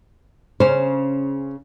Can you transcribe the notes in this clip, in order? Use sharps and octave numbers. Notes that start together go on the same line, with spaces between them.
C#3 C#4 C5